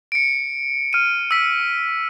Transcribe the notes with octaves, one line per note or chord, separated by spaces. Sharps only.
C#7 D7
F6 D#7
E6 B6